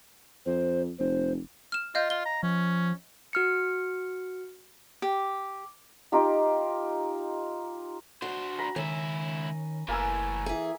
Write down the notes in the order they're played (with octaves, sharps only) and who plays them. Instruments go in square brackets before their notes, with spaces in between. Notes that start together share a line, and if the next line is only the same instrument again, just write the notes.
[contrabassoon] F2 [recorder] C5
[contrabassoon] F1 [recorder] C5
[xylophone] F6 E7
[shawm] F4 [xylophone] D#5 F5 G6
[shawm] F4 [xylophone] G7
[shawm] A#5
[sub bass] F3 [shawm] C#4
[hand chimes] F#4 F6 C#7
[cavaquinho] G4
[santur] D#4 F4 G4
[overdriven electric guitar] D4 C5 [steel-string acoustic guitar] F#4
[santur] A#5 B5
[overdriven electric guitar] C#2 E4 [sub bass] D#3 [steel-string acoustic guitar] C#4
[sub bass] F#1 [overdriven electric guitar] A2 E3 [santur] A#3 G#5 E6
[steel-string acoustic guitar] E3 G#4